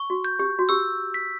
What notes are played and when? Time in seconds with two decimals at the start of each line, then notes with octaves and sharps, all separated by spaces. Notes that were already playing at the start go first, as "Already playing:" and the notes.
Already playing: C#6
0.10 F#4
0.25 G6
0.39 G4
0.59 F#4
0.69 G4 E6
1.14 B6